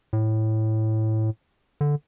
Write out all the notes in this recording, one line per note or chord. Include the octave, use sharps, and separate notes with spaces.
A2
D3